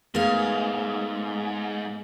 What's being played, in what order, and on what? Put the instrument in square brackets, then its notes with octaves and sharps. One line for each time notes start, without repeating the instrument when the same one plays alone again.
[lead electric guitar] G#2 [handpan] A3 B3 A#4 [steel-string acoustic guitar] G#4 F5